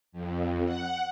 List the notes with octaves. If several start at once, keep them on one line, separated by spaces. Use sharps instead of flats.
F2
F#5